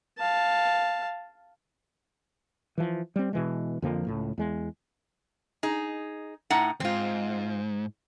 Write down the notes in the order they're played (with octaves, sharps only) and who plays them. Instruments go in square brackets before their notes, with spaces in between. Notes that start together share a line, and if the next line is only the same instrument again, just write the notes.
[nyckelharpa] F5 A5
[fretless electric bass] E3 F3
G3 C4
B2 E3 G#3
F2 D3 F3 A#3
C#2 A2
E2 G#3
[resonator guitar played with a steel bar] D#4 G#4
A2 D#4 F#5
[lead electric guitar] E2 G#2 [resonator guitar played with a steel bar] C4 F4